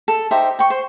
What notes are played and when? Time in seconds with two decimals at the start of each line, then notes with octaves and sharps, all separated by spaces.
0.08 A4
0.31 D#4 G4 C5 E5
0.59 G5 C#6
0.70 C5